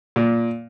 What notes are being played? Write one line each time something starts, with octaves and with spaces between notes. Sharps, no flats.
A#2